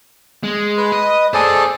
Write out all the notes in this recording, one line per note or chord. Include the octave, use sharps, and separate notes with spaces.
G#3
B4
D#5
G#4 A4 C5 D5 G#5